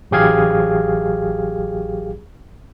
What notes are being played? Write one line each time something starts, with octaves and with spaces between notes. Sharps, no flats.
A1 F#3 G4 G#4 F5 G#6